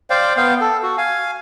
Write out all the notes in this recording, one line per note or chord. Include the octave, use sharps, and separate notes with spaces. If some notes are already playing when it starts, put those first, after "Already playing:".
C5 D5 F5 G5
B3 F5 G5
A4
F#4
F5 G#5